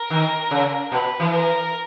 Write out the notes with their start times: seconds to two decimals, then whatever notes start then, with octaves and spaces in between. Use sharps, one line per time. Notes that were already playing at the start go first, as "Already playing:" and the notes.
Already playing: A#4
0.10 D#3
0.51 C#3
0.92 B2 B4
1.20 E3
1.34 A#4